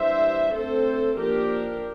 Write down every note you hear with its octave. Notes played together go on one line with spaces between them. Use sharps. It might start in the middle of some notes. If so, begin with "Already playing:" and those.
Already playing: E3 G3 D4 C5 E5
D3 A3 C4 A4 C5
F3 A#3 D4 G4 A#4